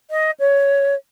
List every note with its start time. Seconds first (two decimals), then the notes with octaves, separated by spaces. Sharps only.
0.11 D#5
0.40 C#5